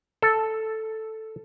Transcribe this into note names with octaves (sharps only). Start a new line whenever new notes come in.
A4